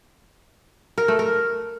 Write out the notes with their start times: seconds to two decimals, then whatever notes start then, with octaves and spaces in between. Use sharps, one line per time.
0.98 A#4
1.08 A3
1.19 A#4